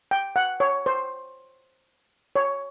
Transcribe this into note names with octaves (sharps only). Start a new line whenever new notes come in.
G5
F#5
C#5
C5
C#5